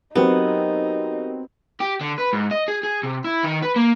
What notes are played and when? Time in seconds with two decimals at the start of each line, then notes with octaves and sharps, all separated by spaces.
0.15 F#3 B3 C4 D#4 G4 A#4
1.80 G4
2.01 D3
2.18 B4
2.33 G#2
2.51 D#5
2.68 G#4
2.83 G#4
3.03 C3
3.24 E4
3.44 D#3
3.63 B4
3.76 A#3